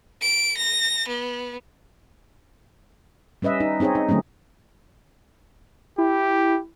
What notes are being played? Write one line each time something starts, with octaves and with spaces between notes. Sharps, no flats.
D7
A#6
B3
G3 C#4 B4 D#5 E5
D#4
C4 D#4 G#4 C#5 D#5
D#4
D3 F#3 A3 C4 C#4
E4 G4